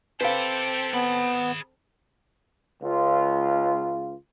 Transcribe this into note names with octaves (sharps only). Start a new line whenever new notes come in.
C4 G4 A4 B4 C5 F5
B3 G#4 B5
C#2 F4